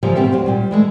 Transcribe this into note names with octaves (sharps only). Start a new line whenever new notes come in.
C#3 E3 F3 G3 A#3
G#2 B2 C4 G4 A#4 E5
D2 F#3 C4
A#2 G3
E3 G#3 A3